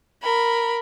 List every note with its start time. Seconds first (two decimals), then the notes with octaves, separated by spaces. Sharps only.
0.23 A#4 B5